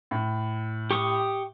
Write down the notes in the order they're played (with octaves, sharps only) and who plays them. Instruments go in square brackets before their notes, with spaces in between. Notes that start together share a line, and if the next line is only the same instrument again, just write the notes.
[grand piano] A2
[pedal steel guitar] G4 C#6 D#6